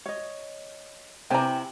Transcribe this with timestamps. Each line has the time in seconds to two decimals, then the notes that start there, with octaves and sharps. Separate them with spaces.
0.06 C#5 D#5
1.30 C3 C4 E4 B4 C5 G5 G#5 A#5